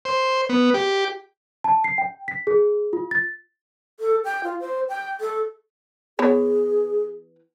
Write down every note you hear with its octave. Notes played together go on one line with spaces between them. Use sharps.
C5
B3
G4
A5
C7
G5
B6
G#4
F4
A6
A4
G5
F4
C5
G5
A4
E3 B3 G#4 C#5